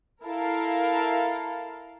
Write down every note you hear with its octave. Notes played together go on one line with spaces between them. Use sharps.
E4 A4 A#4 F5